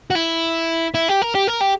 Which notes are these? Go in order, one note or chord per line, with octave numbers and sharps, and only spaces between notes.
F#4
E4
E4
G4
A#4
G4
A#4
G4